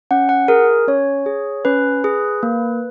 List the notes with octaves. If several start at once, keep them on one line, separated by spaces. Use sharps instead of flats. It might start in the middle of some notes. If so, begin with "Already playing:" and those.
C#4 F#5
F#5
G#4 A#4
C#4 C#5
G#4
C#4 B4
G#4
A#3